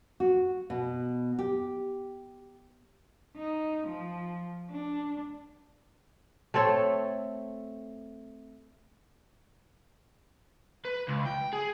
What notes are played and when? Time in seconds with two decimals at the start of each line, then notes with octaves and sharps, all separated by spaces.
0.20 F#4
0.70 B2
1.39 G4
3.37 D#4
3.87 F3
4.71 D4
6.54 A3 C4 A4 C#5
10.85 B4
11.08 C#2
11.26 G5
11.53 G#4